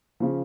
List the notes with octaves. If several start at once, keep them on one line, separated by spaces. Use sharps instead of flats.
C#3 F3